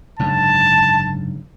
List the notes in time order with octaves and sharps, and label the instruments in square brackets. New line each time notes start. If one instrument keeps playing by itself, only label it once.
[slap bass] F#1 G#2 D3 [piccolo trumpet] A5